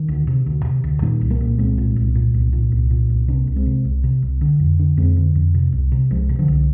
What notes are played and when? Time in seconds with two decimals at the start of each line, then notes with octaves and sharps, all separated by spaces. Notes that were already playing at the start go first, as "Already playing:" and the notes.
Already playing: D#3
0.08 D2
0.27 C3
0.46 D2
0.65 C3
0.84 D2
1.02 A#2 D#3 G3
1.21 C2
1.30 G3 A#3
1.40 A#2
1.58 C2 G#3 C4
1.78 A#2
1.96 C2
2.15 A#2
2.34 C2
2.53 A#2
2.72 C2
2.90 A#2
3.10 C2
3.28 C3 A#3 D4
3.47 C2
3.56 G#3 C4
3.66 C3
3.85 C2
4.04 C3
4.22 C2
4.41 D3
4.60 F2
4.79 D3
4.97 F2 G#3 C4
5.17 D3
5.35 F2
5.54 C3
5.72 C2
5.92 C3
6.11 C2 F3 G#3
6.29 C3
6.39 D3 F3
6.48 C2